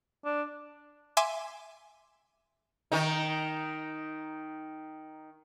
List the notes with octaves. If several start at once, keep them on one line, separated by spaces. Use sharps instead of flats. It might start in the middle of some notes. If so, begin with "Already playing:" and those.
D4
E5 G#5 C6 D6 E7
D#3 D#4